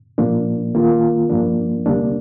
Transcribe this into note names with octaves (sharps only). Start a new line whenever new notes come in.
A#2 F3 A#3 D4
D#3 A#3 F4
G2 F3 A#3 D4
D2 C3 G3 A#3 D4